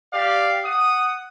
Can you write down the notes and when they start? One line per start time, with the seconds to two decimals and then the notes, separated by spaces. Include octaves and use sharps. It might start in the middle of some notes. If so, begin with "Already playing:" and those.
0.14 G4 D5 F5
0.65 F#5 D#6